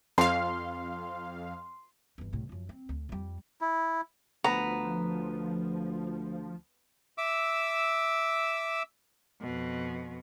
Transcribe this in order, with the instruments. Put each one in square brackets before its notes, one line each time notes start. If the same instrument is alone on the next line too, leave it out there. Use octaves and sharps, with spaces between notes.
[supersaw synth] F2 F5 [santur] C6
[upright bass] G1 E2
C2 A2
F#2 F3
C4
D2
F2 G3
[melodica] E4
[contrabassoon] D2 [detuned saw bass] F3 [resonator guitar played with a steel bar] B3 [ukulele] A#5
[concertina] E5 D6 E6
[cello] F2 B2